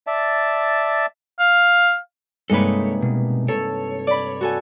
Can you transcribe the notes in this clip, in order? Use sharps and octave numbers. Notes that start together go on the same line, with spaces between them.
D5 E5 A5
F5
G2 C3 G#3 A#3 D#4 A4 B4 C#5
B2
A4 C#5
D5 B5
F#4 A4 G#5